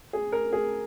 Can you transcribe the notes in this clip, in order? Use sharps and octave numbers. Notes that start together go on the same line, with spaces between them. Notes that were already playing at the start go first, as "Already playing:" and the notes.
G#4
A#4
G#4